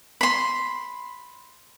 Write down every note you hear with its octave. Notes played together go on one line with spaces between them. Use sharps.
B5 C6